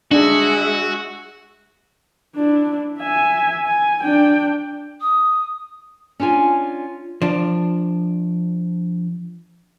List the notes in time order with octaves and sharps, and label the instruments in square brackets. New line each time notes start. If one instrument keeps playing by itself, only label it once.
[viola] G#3 E5 [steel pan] D4 [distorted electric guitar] F#4
[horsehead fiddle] D4 E4
E5 G#5
G#5
D4 G5
[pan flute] D#6
[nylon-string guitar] C#4 D4 F4 G#5
[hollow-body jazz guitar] F3 D4